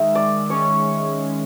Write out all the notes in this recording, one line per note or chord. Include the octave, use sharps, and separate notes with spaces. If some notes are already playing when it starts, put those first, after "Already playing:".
Already playing: D#3 G#3 E5
D#3 D5
C#4 C#5